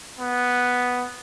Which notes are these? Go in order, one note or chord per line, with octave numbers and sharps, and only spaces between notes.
B3